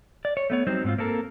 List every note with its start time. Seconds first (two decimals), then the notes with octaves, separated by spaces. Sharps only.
0.25 D5
0.37 C#5
0.50 A3 B3 C#5
0.67 F#3 G3 C4 D#4 C5
0.84 G#2 C4 F4
0.98 A#3 C4 A4 A#4